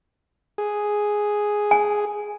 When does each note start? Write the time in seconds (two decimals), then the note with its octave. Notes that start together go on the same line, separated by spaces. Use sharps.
0.58 G#4
1.71 G#5